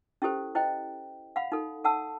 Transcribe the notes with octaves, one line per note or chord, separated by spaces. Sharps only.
C#4 E4 G4 A4 C5
E4 C5 D#5 G5
F5 F#5 B5
D#4 A4
A4 F#5 A5 E6